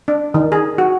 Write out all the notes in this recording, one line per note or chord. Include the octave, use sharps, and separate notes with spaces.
D4
D#3
G#4
F#4